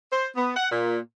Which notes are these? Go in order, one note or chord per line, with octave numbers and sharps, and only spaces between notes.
C5
B3
F#5
A#2